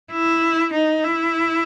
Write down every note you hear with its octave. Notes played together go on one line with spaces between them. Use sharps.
E4
D#4
E4